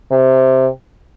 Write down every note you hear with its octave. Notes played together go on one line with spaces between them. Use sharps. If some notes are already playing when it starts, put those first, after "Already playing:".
C3